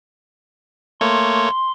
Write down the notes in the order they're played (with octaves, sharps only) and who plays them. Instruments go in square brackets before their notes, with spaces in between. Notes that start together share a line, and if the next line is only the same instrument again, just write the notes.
[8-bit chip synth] A3 A#3 C#5 [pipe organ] C6